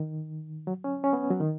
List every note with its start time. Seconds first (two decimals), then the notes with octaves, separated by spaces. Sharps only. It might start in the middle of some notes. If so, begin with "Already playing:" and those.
Already playing: D#3
0.67 F#3
0.84 C#4
1.04 C#4
1.13 B3
1.30 F#3
1.40 D#3